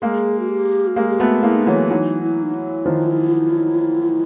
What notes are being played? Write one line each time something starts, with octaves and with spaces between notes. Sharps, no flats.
G#3 A#3 G#4
F#4
G4
F#4
G#3 A#3 G4
G4
A3 B3 F#4
G#3 A#3 E4
D#4
E3 F#3 E4
E3 F#3 D#4
E4
D#4
E4
D#3 F3